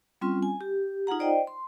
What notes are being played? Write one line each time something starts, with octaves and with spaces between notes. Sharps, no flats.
G3 C4 C#4 F4 C6
G#5
G4
D#4 F4 G#4 F#5 A#5
C5 D5 D#5 G5
C6